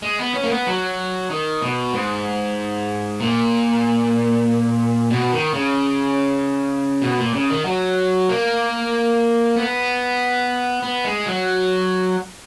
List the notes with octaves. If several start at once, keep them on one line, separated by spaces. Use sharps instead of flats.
G#3
B3
C#4
A#3
B3
F#3
D#3
B2
G#2
A#2
B2
D#3
C#3
B2
A#2
C#3
D#3
F#3
A#3
B3
B3
G#3
F#3